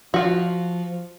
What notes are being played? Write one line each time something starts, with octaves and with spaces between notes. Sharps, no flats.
F3 F4 F#4